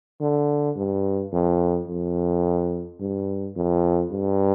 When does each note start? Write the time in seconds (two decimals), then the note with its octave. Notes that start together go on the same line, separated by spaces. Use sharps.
0.21 D3
0.76 G2
1.32 F2
1.88 F2
3.00 G2
3.56 F2
4.11 G2